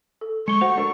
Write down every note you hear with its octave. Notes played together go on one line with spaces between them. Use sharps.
A4
G#3 C#6 C#7 G7
A3 F#4 C5 F#5 F7
D4 A4 A#4